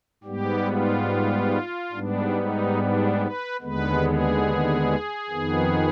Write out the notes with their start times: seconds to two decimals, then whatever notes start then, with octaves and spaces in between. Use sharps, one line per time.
0.24 G#2 G3 B3 G4
0.66 F4
1.92 G#2 G3 B3 D4
2.35 D#4
2.77 D4
3.20 B4
3.61 D#2 D3 G#3 B3 B4
4.03 G#4
5.30 F2 D#3 B3